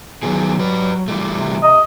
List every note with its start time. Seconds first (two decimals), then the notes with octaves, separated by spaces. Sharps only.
0.23 D#3 F#3 B3 G#4
0.59 G4 B4
1.08 E3 G3 A3
1.31 C3
1.63 D#5